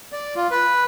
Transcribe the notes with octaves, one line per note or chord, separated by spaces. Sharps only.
D5
F4
B4